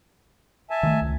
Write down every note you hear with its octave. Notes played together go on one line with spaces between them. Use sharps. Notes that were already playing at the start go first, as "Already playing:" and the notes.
E5 G#5 A5
D#3 E3 A3
C#2